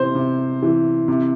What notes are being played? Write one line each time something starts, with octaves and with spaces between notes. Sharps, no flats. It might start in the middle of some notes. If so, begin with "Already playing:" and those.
Already playing: C3 E3 C5
C3
E3
C3